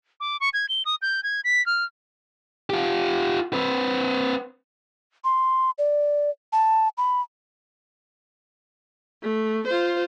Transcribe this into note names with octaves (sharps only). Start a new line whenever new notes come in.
D6
C#6
G#6
G7
D#6
G6
G#6
B6
F6
F4 G4
C4 B4
C6
D5
A5
B5
A3
F4 C5